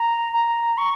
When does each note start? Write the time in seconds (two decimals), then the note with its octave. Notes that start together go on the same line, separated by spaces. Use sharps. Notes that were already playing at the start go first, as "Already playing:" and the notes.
Already playing: A#5
0.33 A#5
0.78 C#6